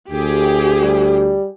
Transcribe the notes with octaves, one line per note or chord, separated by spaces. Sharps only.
D2 G4 G#4
G3